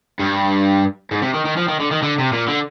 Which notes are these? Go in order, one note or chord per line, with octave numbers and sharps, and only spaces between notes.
G2
G#2
C3
D#3
D#3
F3
D#3
D3
D#3
D3
C3
A#2
D3